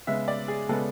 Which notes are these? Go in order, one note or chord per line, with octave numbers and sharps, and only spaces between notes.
C#3 G#3 B3 E5
D5
G#4
C#3 G#3 B3 A4